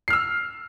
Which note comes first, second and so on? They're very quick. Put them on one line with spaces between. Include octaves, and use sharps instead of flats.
C7 F6 E6